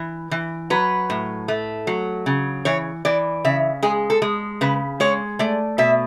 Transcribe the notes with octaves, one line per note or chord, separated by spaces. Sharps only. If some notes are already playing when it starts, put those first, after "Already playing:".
Already playing: E3
E3
F#3 B4
A2
A3
F#3
C#3
E3 C#5
E3 D5
C#3 E5
G#3 G#4
A4
G#3
C#3 B4
G#3 C#5
A3 D5
B2 E5